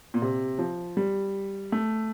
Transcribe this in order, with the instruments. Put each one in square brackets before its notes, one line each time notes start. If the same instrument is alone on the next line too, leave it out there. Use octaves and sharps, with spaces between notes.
[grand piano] A#2
C3
F3
G3
A3